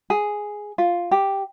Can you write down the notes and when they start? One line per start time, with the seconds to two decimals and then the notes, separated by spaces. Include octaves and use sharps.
0.10 G#4
0.78 F4
1.11 G4